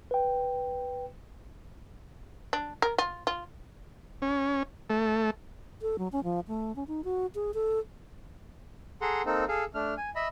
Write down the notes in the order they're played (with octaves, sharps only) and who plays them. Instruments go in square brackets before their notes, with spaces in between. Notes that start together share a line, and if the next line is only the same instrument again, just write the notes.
[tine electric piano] B4 G5
[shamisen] D4
A#4
F4
F4
[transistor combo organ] C#4
A3
[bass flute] A4
F#3
C#4
F3
A3
C#4
D#4
F#4
G#4
A4
[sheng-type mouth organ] G#4 A4 F#5 A#5 C6
A#3 C4 D#4 A4
G#4 A4 F5
A3 D4 F6
G#5
D#5 E5 B5